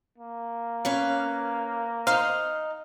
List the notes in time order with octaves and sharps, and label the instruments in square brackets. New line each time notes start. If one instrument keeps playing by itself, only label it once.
[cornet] A#3
[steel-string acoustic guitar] C#4 B4 F5
[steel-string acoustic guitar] D#4 [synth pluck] C5 F5 [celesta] F6